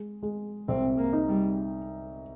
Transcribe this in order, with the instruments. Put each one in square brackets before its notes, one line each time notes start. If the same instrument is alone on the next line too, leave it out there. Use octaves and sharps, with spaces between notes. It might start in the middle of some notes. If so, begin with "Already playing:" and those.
Already playing: [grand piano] G#3
G#3
[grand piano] C2 [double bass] C4
[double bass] A#3
[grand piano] D#4
[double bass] G3